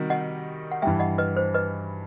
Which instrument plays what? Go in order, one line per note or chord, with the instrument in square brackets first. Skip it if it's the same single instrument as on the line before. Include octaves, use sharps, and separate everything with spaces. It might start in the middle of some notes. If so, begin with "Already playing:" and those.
Already playing: [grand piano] C3 D#3 G3 D#4 F#4
[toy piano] D#5 F#5
F#5
[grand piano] G2 E3 G3 [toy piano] E5 G5
[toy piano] D#5 F#5
B4 D#5
C5
B4 D#5